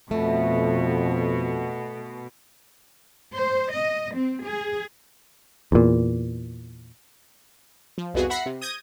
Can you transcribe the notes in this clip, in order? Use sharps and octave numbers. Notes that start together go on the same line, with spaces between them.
F2 B2 A3
C5
D#5
C4
G#4
E2 A#2
F3
C2 F2 B3 F#4 G#4
E5 F#5 B5 A#6 C7 C#7
C3
D#6 G6 G#6 A#6 D#7